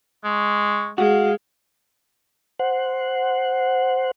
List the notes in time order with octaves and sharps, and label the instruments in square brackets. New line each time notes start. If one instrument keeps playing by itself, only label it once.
[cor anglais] G#3 [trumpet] C#6
[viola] G#3 [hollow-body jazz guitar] F#4 [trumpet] F5
[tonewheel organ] C5 F#5